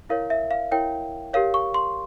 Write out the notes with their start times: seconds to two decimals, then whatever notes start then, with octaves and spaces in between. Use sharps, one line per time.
0.09 E4 A#4 C#5 F5
0.30 E5
0.51 F5
0.71 E4 A#4 C#5 G5
1.34 G4 A#4 C#5 F5
1.54 C#6
1.74 C6